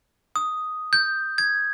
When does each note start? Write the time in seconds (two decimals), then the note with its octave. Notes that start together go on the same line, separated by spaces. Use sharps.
0.36 D#6
0.93 G6
1.38 G#6